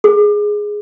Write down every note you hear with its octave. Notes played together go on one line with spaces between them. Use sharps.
G#4